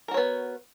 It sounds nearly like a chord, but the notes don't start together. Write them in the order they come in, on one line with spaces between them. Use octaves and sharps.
A#4 F#4 C#5 B3